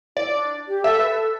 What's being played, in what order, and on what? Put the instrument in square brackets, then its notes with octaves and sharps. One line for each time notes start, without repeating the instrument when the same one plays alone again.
[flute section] E4 [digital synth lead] D5
[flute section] E4
D4
G4
[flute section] A4 [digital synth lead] E5
[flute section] B4
A4